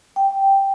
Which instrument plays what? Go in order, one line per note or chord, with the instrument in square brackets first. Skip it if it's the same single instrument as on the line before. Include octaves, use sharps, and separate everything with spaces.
[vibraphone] G5